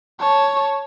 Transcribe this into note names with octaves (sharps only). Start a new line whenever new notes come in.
C#5 A5